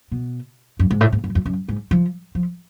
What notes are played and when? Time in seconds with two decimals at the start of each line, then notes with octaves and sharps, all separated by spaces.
0.12 B2
0.79 F#2
0.91 G#2
1.01 A2
1.12 G#2
1.24 F#2
1.35 F2
1.45 F#2
1.68 G#2
1.91 F3
2.35 F3